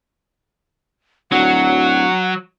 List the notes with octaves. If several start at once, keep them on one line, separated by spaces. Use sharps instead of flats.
D1 F#3 F#5